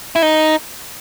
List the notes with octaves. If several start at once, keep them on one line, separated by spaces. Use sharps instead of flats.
E4
D#4